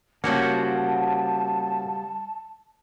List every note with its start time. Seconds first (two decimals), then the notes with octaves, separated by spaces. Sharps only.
0.24 C#3 G3 A#3 C#4 F#4 C5 F#5 A5